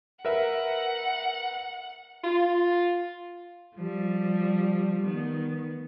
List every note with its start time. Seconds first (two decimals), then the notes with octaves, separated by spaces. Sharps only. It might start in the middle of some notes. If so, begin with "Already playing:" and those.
0.25 A#4 B4 E5 F#5
2.24 F4
3.75 F3 G3
5.05 D#3 B3